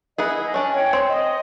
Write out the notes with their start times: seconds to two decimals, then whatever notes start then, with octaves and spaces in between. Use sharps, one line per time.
0.18 B3 E4 G#4 D#5
0.54 C#4 D4 D5
0.72 C#5 G5
0.93 C4
1.09 D#5